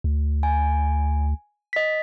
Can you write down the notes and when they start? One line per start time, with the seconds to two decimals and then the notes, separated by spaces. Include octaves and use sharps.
0.04 D2
0.43 G#5
1.73 D#5 B6